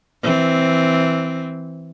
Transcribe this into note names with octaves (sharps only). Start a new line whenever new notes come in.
E3 C4